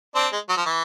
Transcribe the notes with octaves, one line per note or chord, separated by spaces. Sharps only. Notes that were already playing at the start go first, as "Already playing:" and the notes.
C4 D4
G#3
F#3
F3
E3